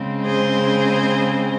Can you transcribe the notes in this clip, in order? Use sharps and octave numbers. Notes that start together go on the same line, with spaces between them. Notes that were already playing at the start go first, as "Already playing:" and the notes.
Already playing: C#3 G#3 C4
G#4 C5